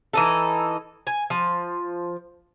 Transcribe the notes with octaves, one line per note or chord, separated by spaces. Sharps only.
E3 D#4 A4
G#5
F3